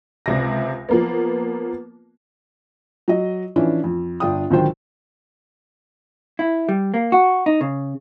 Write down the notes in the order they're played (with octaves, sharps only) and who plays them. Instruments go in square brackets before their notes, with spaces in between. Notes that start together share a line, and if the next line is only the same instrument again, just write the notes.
[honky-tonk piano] C#2 C3 A#6
F3 A#3 B3
[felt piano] F#3 D#5
E3 F3 C#4 D4 E4
F2
G1 D4 F4 G5 D#6
C#2 D3 D#3 F#3 C5 G5
[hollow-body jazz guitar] E4
G3
A#3
F#4
D#4
C#3